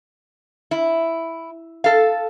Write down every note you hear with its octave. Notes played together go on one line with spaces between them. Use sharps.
E4
A4 F5